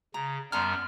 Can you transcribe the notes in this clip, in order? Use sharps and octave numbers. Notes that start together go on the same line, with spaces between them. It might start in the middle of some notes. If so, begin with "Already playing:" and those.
C#3 A#5
F#2 G3 B3 A5 A#5 C6 F6